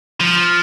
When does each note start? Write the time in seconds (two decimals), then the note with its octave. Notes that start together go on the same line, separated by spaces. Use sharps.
0.20 F3